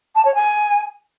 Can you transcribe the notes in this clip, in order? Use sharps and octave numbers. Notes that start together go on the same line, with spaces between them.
A5
C#5
G#5